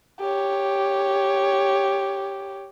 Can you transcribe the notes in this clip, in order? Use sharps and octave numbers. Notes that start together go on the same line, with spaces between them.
G4 C#5